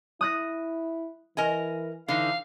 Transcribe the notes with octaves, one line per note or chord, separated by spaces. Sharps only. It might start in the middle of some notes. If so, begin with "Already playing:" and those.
E4 D#6 F#6 A#6
E3 A#4 D#5 G#5
D3 E3 D#4 F5